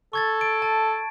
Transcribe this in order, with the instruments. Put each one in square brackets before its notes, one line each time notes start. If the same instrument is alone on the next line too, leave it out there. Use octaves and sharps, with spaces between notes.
[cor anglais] A4 [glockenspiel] C#6 G#6 A6
[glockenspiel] D7
A5